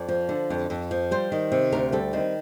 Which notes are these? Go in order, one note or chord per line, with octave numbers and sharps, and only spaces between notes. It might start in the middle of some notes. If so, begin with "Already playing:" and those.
Already playing: F2 D5
F3
D3
F2
F2
F3
G3 C5
D#3
C3
D2 A#4
G3 A4
D#3 C4